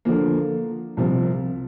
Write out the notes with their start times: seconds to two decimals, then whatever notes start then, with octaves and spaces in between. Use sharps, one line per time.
0.05 D3 F3 A#3
0.97 C2 C3 F3